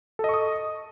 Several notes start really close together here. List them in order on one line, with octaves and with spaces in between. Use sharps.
A4 D#5 C#6 D#6